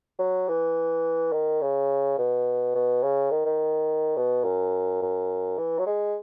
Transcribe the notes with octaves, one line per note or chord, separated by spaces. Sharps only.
F#3
E3
D#3
C#3
B2
B2
C#3
D#3
D#3
B2
F#2
F#2
E3
F#3
G#3